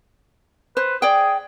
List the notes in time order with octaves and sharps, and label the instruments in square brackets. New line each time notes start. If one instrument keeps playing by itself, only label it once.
[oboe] B4 [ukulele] C5
[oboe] G#4 [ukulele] D5 G5